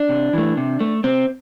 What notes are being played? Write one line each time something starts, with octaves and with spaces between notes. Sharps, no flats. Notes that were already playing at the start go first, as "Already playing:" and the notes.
Already playing: D4
C3
E3 A3
C3
A3
C3 C4